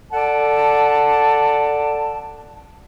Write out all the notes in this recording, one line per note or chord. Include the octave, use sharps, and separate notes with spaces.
A4 D5 F#5 A5